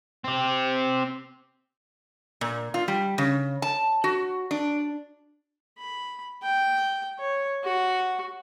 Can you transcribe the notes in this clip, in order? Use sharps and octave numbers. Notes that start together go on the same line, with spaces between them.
C4 G4
A#2
F4
G3
C#3
A5
F#4
D4
B5
G5
C#5
F#4